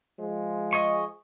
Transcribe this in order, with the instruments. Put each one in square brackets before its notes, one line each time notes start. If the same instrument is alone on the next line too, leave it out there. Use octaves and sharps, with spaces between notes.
[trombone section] F3 G#3
[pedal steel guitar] D#5 G#5 C#6